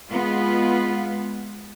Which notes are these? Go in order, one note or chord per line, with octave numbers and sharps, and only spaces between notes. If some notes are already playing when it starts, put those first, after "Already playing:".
G#3 B3 F4